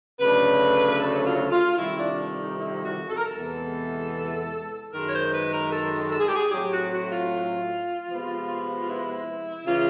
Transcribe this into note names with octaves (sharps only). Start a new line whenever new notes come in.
D2 C#3 F#3 A3 D4 B4
A4
F4
F4
F2 C3 D#3 G3 E4
D4
D#4
E4
F#4
A4
A#4
A4
E2 C3 E3 G#3 B3
F#2 D#3 G#3 A#4
C#5
C5
B4
A#4
A4
A4
G#4
G4
G#4
A2 F#3 A3 C4 G4
F#4
F#4
F4
C3 F3 G#3 B3
F4
E4
C#3 E3 G#3 F4